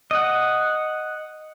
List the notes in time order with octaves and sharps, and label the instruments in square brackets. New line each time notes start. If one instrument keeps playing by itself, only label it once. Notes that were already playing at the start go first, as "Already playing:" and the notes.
[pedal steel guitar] D#5 F#5